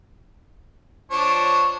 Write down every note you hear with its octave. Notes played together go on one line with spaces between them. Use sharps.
F3 D4 C#5